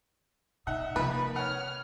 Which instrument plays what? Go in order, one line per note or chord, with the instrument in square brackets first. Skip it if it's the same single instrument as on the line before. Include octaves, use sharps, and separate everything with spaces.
[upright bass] B2 [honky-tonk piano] D#4 F#5 [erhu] E5
[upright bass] C3 [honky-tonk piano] D#3 F3 A#3 [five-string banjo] B4 [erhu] B5
[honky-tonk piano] C#5 F#5 [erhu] F6